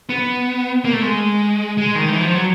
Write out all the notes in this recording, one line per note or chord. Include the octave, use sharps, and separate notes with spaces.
B3
A#3
A3
G#3
G#3
D#3
E3
F3
F#3